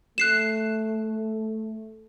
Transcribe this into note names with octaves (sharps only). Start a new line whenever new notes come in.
A3 F#6 C7 E7